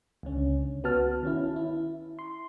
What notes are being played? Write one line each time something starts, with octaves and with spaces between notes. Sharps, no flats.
C#2 D3 C#4
B3 F#4 A5 F6
D#3 C#4 E4
E4
C6